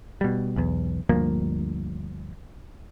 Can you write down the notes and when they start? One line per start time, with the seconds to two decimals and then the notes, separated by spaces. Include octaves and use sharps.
0.21 B2 G3
0.56 B1 E2
1.09 D2 G2 F3 A#3